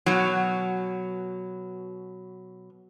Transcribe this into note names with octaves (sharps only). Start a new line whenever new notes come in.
B2 F#3